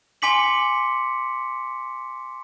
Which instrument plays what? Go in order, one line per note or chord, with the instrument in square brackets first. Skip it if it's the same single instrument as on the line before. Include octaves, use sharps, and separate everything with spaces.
[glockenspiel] G#5 C6 D6 B6 C#7 F#7